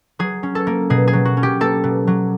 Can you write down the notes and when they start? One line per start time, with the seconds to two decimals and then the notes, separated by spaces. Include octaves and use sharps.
0.19 F#3 G#4
0.43 C#4
0.55 A4
0.67 A#3
0.90 B2 G#4
1.07 G#4
1.13 F#3
1.25 F#4
1.37 C#4
1.43 G4
1.60 A#3 A4
1.84 B2
2.07 F#3